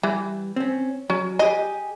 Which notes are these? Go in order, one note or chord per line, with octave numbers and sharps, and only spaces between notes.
E3 G3
C4 C#4
F#3 C#4
G4 G#4 D#5